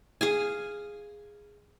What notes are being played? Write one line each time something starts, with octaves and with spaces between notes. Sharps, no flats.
G#4 F5 G#5